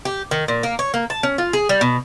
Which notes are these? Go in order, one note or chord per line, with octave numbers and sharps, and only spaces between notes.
G4
D#3
A#2
A#3
C#5
A#3
A5
C#4
F4
G#4
G3
B2